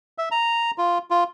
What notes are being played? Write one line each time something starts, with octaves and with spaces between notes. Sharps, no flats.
E5
A#5
F4
F4